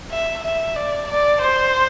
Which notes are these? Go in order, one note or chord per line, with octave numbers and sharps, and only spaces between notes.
E5
E5
D5
D5
C5